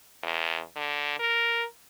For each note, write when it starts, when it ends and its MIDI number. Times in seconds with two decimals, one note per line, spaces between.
0.23 0.60 40
0.76 1.18 50
1.19 1.64 70